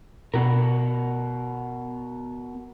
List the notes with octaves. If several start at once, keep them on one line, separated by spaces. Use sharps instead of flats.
B2 B3 F#4 A#4